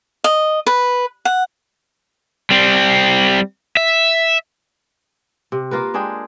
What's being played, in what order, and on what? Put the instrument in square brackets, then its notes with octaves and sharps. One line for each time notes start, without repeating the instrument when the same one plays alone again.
[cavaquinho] D#5
B4
F#5
[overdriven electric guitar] G3 C4
E5
[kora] C3
A#3 F4 A#4 B4
G#3 D4 G#4 G5